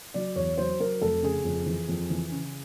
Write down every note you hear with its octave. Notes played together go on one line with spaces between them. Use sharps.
F#3 D5
E2 C#5
F#3 C5
F#3 A#4
F1 A4
C#3 G#4
F2
E3
F2
E3
C#3